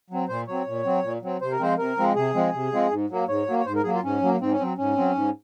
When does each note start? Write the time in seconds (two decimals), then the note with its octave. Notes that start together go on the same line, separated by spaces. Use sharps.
0.10 F#3 C4
0.28 A#2 C5
0.47 F#3 C4 C#5
0.67 A#2
0.85 F#3 C4
1.03 A#2
1.22 F#3 C4
1.41 C3 C5
1.52 A#4
1.59 F3 G#3 C4 C5
1.78 C3 A#4
1.97 F3 G#3 C4
2.15 C3 G#4
2.35 F3 G#3 C4
2.54 C3
2.72 F3 G#3 C4
2.91 G#2
3.10 F#3 A#3
3.28 G#2 C#5
3.47 F#3 A#3
3.59 C#5
3.66 G#2 C5
3.75 A#4
3.84 F#3 A#3 G#4
3.94 F4
4.03 G#2 C#4
4.22 F#3 A#3
4.40 G#2 C4
4.52 C#4
4.59 F#3 C4
4.77 G#2 C#4
4.96 F#3 C4
5.15 G#2